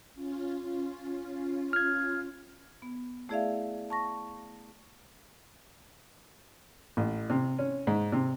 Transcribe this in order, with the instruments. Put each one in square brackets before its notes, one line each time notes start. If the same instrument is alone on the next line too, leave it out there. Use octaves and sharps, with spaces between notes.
[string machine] C#4 F4
[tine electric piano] F6 G#6
[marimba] B3
A3 E4 G#4 D5 E5 F5
A5 C#6 A#6
[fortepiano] A1
C3
C#4
G#2
C3